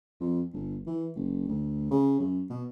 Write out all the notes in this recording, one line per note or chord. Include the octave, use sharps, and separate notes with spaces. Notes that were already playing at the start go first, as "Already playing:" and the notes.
F2
G1
E3
F#1
D2
C#3
F#2
B2